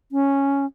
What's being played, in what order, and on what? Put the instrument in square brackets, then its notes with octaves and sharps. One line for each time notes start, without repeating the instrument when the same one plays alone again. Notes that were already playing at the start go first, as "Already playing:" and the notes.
[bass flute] C#4